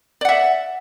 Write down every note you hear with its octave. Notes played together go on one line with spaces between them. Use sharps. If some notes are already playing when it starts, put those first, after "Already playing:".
D5 E5 F#5